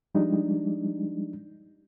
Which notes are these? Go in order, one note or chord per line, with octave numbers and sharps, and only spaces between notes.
F3 G3 G#3 D4 D#4